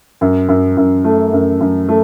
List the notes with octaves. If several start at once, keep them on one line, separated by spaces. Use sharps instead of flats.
F#2
F#2
F#2
A3
F#2
F#2
A3